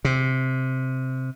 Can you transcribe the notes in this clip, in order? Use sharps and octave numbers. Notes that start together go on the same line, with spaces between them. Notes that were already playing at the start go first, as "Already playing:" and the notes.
C3